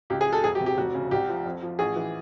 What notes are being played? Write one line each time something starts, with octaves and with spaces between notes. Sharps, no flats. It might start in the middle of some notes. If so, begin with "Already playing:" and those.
C#2 G4
G#4
F#3
A4
E1 G#4
G4
C3
G4
F1 F#4
C#3
C2 G4
F3
F2
F3
A1 G#4
E3